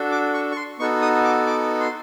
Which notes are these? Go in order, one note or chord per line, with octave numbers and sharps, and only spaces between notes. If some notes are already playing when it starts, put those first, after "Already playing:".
Already playing: D4 F#4 A4
D6
C#6
C#6
C6
B3 D#4 F#4 A4 C#6
D#6
D6
D6
C6